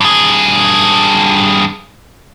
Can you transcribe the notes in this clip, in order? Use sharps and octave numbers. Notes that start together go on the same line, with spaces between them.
G2 G#4